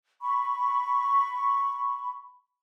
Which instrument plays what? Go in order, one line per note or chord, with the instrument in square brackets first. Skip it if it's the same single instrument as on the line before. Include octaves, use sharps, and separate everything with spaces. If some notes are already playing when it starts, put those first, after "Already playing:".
[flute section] B5 C#6